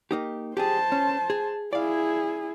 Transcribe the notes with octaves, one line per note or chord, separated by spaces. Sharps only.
A#3 D#4 G4
G4 G#4 C5 A5
C#4
G#4
E4 G#4 D5 F5